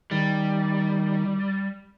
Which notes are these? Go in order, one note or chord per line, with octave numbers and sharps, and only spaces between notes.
D#3 G3